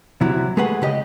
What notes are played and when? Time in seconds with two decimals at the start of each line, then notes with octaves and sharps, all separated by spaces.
0.21 C2 C3 F#3 E4
0.57 G#3 A3 G4 G#4 B4 F#5
0.82 C#3 G4 D#5